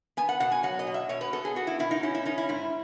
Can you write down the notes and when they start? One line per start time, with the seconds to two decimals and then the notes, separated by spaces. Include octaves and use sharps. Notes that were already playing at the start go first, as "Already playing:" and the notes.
0.17 B3 G#5
0.29 F#5
0.40 B2 F#5
0.52 G#5
0.63 F#3 F#5
0.79 D#5
0.87 B2
0.94 E5
1.09 B2 C#5
1.21 B4
1.33 B3 A4
1.45 G#4
1.56 B3 F#4
1.67 E4
1.79 B2 E4
1.91 D#4
2.03 C#4 E4
2.15 E4
2.25 C#4 D#4
2.38 E4
2.49 G#2 E4